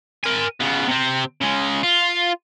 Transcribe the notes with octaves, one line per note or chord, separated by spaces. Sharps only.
A#4 G#5
C#3 B3
C3 C4
C#3 G#3
F4